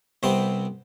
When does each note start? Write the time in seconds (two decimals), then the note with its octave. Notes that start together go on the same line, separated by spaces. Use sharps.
0.23 C2 C3 B3 C4 C6